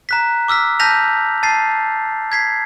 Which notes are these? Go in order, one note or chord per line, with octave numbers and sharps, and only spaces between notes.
A#5 F#6 B6
D6 E6 F6 B6
A5 F6 G6 A#6 B6 F7
A5 A6 C7
G#6 B6 C7